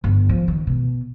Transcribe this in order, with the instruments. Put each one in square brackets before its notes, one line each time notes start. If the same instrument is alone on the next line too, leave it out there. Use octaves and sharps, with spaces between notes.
[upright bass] G1
F3
D#3
B2